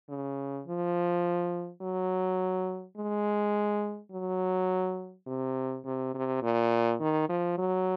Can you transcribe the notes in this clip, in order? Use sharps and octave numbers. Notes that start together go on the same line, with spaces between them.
C#3
F3
F#3
G#3
F#3
C3
C3
C3
A#2
D#3
F3
F#3